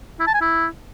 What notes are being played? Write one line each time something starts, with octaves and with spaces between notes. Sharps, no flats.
E4
A5
G#5
E4